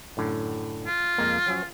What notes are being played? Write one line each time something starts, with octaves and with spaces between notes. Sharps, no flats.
F#2 A2 D3
F4
F2 G#3 A#3
F3 F#3 C#4